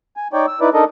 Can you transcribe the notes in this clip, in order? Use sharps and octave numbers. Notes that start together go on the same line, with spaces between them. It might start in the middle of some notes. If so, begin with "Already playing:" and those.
G#5
D#4 C#5 D5 G5
E6
D#4 E4 B4 D5
D4 D#4 A4 A#4 D#5